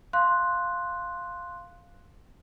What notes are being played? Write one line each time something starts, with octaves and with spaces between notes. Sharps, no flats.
F5 C6 F#6